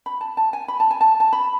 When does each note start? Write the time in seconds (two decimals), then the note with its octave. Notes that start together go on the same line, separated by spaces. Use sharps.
0.06 B5
0.21 A5
0.37 A5
0.53 G#5
0.68 B5
0.80 A5
0.91 G#5
1.01 A5
1.20 A5
1.33 B5